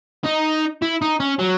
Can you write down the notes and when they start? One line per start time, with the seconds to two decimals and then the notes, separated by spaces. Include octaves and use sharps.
0.24 D#4
0.82 E4
1.02 D#4
1.20 C#4
1.39 F#3